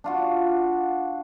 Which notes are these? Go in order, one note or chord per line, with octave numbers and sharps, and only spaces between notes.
D4 F4 F#4